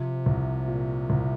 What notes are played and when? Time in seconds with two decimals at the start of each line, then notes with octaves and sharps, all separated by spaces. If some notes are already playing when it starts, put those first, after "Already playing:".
Already playing: C3 F3
0.26 C2
0.68 A#2
1.10 C2